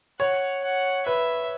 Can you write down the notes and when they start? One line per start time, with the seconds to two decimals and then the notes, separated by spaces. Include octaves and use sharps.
0.20 C#5 F#5
0.64 F#5
1.06 B4 E5